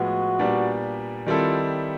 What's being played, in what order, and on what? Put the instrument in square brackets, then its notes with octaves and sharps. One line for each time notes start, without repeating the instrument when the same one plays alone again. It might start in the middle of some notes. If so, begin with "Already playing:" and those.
Already playing: [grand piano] A2 F3 G#3 B3 [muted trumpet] F#4
[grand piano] A#2 G3 B3 D4
[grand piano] D#3 G3 C4 E4 A4 [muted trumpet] F4